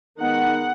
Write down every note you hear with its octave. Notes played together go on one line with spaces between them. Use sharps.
D#3 G#3 B3 D#4 F#5